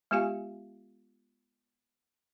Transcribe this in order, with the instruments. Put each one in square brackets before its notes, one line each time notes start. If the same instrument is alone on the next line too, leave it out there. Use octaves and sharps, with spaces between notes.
[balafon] G#3 B3 F4 G4 F5 G#5